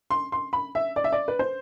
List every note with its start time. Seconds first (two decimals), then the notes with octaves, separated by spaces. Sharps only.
0.10 C6
0.32 C6
0.53 B5
0.75 E5
0.96 D5
1.04 E5
1.12 D5
1.28 B4
1.39 C5